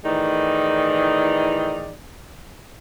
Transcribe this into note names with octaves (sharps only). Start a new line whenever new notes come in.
A2 D#3 E3 D#4 G#4 D5